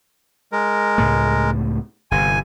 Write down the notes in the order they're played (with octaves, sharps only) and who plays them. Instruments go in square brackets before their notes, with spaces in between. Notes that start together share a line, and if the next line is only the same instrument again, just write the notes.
[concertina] G#3 A#4
[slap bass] C#2 A2 A3
[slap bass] G1 C3 [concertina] G#5